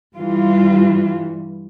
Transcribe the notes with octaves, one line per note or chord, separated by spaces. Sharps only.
G2 E3 G3 F4